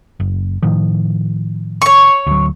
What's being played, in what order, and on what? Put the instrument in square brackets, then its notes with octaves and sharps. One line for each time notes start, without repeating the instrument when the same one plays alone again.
[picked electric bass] F#1
A2 D#3 F3
[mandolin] C#5 C#6
[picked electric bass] D2 F#3